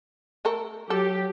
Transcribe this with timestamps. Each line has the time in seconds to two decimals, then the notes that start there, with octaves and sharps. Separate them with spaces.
0.45 A3 A4 A#4
0.90 F#3 G4 A4